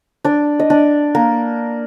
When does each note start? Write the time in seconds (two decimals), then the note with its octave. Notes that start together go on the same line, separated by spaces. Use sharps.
0.24 D4 D5
0.59 D#5
0.70 D4 D5
1.15 A#3 A#4